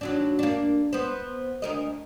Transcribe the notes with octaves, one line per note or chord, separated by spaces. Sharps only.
D#2 F#3 D4
A#3 D4
B3 C5
D2 A#4 D#5